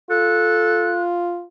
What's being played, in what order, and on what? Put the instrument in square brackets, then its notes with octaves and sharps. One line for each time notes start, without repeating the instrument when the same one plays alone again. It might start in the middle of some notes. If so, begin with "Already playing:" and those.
[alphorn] F4 [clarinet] A4 [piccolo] F#6